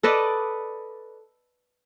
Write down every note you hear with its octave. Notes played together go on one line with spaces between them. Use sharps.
A4 B4 D5 D#5